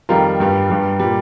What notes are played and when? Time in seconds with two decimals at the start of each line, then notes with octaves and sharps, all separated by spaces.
0.09 F2 D#3 G3 F4 A#4
0.40 G2 G3
0.70 G2 G3
0.99 A#2 G3